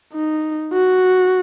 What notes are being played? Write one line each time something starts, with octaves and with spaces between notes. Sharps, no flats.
D#4
F#4